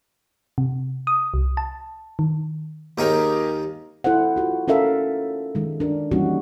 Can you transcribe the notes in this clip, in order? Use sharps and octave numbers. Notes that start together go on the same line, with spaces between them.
C3
D#6
C2
A5
D#3
D#2 D#4 G4 G#4 A#4 G5
E4 A4 C5 F#5
F4 F#4
C#4 A4 A#4 E5 F5
D#3 G#3
D4 A#4
E3 G3 A#3 C#4 D#4 F#4